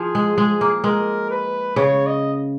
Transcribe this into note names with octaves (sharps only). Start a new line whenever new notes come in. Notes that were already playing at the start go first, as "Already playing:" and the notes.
Already playing: F3 G#4
G#3
G#3
A#3
G#3 A#4
B4
C#3 C#5
D#5